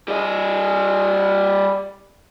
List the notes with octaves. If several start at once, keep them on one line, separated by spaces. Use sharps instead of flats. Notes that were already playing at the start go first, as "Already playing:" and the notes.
G3 D#5